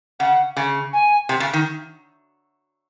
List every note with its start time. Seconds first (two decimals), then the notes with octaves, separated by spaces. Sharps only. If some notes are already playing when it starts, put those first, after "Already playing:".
0.19 C#3 F#5
0.57 C#3
0.93 G#5
1.29 C3
1.40 C#3
1.53 D#3